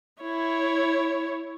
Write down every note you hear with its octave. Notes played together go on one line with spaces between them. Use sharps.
E4 C#5